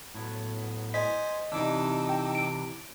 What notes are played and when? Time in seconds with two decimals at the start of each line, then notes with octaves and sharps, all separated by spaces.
0.14 A2 F#3 B3
0.94 C5 D#5 G#5 B6
1.52 C3 E3 D4 D#4 D6 E6
2.09 G5
2.35 D7